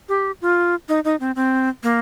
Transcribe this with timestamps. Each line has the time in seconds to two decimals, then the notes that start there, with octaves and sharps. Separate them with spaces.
0.09 G4
0.42 F4
0.89 D#4
1.05 D#4
1.20 C4
1.36 C4
1.83 A#3